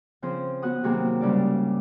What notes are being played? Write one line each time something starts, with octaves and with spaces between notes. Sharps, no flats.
C#3 F3 C4 G#4 C5
B3 F#4 F#5 D#6
C3 D#3 F#3 A#3 F#4 G#4
G#2 C#3 G3 D5